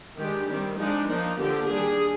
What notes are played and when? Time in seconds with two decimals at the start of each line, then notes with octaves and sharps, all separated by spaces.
0.17 D#3 G#3 D4 G4
0.47 D#3 G3 C4
0.78 F3 G#3 D4 D#4
1.08 F3 A#3 D4 D#4
1.38 D3 F3 A#3 D4 G4
1.68 D#3 G3 D4 G#4